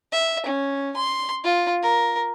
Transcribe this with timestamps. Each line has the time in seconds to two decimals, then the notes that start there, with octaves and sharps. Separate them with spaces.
0.12 E5
0.46 C#4
0.96 C6
1.44 F4
1.83 A#4